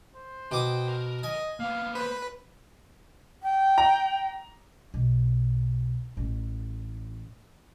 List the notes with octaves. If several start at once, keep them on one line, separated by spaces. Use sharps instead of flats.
C5
B2 G5 D6 D#6
A#4
D#5 G#5
A#3 B3 F5
B4 C5
G5
A#5
B1
A1